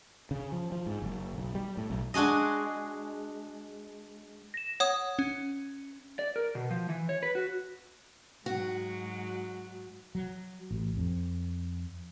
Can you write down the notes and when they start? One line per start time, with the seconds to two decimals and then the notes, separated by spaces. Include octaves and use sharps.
0.31 C#3
0.52 F3
0.72 F3
0.86 G#2
1.02 F#1
1.33 B1
1.55 G3
1.77 A2
1.90 B1
2.14 G#3 D4 F#4 G#4 D#5
4.54 A#6 E7
4.80 C#5 F#5 D#6
5.19 C#4
6.19 D5
6.36 A#4
6.55 B2
6.71 F3
6.89 E3
7.09 C#5
7.23 B4
7.35 F#4
8.46 G#2 F#3 F#4
10.15 F#3
10.71 A1
10.97 F2